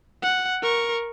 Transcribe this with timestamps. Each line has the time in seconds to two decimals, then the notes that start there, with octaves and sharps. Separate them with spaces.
0.22 F#5
0.62 A#4 C#6